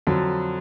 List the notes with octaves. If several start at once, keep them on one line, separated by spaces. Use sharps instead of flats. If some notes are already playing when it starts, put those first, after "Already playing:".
F2 D3 F#3